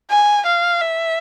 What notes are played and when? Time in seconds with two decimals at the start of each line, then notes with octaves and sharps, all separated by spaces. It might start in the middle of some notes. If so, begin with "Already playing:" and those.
0.10 G#5
0.46 F5
0.81 E5